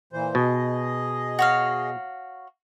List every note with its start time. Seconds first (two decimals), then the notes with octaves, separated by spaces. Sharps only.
0.13 A#2 E3 C5
0.35 B2 G#4 D#5
1.39 F#4 C#5 F5